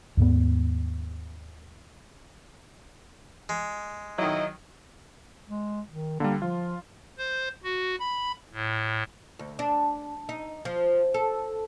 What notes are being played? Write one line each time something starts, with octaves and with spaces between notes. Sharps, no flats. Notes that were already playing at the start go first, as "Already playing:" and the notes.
D#2 G#2 B3
G#3
D#3 F#3 D#4 E4 D#5
G#3
D#3
D3 G3 A#3
F3 F4
C5
F#4
B5
A2
D2
D4
D#4
F3
A4